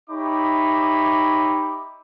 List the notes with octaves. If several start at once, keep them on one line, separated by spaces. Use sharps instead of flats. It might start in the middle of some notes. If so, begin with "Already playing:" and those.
D#4 G4 C#5 E5 B5 D6